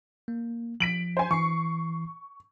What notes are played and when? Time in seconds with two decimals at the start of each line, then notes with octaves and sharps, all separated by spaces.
0.28 A#3
0.80 F3 B6 D7 F#7
1.17 C5 G#5
1.31 E3 C#6 C7